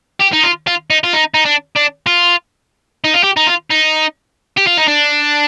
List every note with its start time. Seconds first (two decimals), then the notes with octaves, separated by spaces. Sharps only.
0.20 G4
0.33 D#4
0.43 F4
0.67 F4
0.90 D#4
1.04 F4
1.14 D#4
1.34 D#4
1.45 D4
1.76 D4
2.07 F4
3.04 D#4
3.14 F4
3.23 G4
3.37 D#4
3.46 F4
3.70 D#4
4.57 G4
4.67 F4
4.77 D#4
4.88 D4